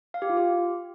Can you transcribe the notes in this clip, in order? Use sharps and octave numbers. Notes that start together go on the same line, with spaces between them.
F5
G4
F4
G4